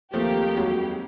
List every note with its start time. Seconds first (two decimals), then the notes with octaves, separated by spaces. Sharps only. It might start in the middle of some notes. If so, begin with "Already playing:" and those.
0.13 D#2 F3 A3 A#3 C4 G4
0.56 F2 F#3 G#3 F#4